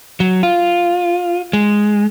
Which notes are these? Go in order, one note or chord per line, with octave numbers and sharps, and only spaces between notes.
F#3
F4
G#3